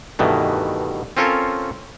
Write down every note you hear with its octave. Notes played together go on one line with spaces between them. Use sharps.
G2 B2 D#3 E3 A3
C4 C#4 F4 A4 A#4 C#5